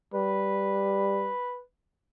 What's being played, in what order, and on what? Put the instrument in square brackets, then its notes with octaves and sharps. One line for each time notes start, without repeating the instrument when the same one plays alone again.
[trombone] G3 [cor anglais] B4